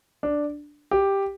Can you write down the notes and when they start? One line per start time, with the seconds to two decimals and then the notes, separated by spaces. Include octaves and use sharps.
0.23 D4
0.91 G4